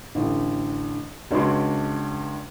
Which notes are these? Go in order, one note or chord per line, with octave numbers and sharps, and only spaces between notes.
A1 D3
C#2 D4 F#4 C#5 C6